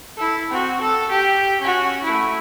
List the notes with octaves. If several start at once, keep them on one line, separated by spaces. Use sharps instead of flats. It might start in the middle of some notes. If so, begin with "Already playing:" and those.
E4 A4
C4 F#4
A4
G4
C#4 F#4
A3 E4